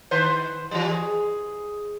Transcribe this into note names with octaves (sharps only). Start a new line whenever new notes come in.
D#3 B4 C5
E3 F#3 G3
G#4